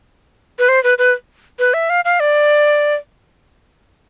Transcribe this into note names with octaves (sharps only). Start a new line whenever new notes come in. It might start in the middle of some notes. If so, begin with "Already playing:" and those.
B4
C5
B4
B4
B4
E5
F5
F5
D5